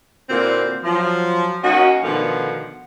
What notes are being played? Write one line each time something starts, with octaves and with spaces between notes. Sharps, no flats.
A#2 D3 A#3 C4 E4 F#4
F3 F#3
A#3 C#4 D#4 F#4
B2 D3 D#3 F3 A3 F#5